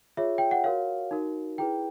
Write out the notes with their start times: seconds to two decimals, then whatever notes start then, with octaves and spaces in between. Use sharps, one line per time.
0.17 F4 G#4 C#5 E5
0.38 G5
0.51 F#5
0.64 F#4 A#4 C#5 F5
1.11 D#4 F#4 A#4
1.58 E4 G#4 B4 G5